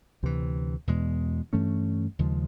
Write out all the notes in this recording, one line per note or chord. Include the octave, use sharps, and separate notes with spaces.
D2 C3 E3
E2 B2 G#3
G2 E3 A3 C#4
D#2 C#3 F3 G#3